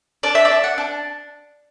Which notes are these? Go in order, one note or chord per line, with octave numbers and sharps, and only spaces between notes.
D4 D5
E5
D5
D4
F#5
D4